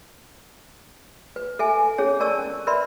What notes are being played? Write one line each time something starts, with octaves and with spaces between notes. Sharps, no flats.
B4
A4 E5 G#5
C#4 G#4 C#5
A#4 D5 A5 C#6 E6
C#4
A#4 B4 D5 E5 B5 C6